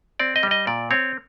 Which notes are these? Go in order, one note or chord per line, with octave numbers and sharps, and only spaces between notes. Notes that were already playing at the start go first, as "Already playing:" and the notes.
C4 D5
D#5
G3
D#5
A#2 D5
C4 C#5